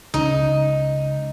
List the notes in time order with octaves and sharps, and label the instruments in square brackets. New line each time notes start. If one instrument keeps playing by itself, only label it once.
[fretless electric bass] C#2 C#3 [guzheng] D#4